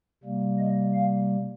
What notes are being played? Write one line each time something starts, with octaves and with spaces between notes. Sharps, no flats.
C3 G3 A#3
D#5
F5